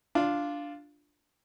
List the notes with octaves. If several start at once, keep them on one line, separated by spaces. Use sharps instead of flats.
D4 F4